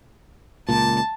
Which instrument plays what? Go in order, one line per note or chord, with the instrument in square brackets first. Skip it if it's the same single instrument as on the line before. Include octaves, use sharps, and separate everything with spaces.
[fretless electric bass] C#2 A#2 [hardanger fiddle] A5